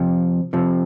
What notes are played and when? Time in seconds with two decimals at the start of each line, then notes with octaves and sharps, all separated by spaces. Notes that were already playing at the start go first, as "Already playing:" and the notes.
Already playing: F2 C3 F3
0.53 F2 C3 F3